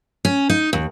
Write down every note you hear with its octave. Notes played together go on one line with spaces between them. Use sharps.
C#4
D#4
D#2